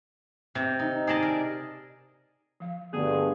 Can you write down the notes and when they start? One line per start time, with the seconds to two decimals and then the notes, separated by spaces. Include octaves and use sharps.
0.55 C3
0.79 D#4
1.07 G#4 D5 D#5 A5
1.22 A#4
2.60 F3 F5
2.93 G2 B2 D3 A3 B3 G#4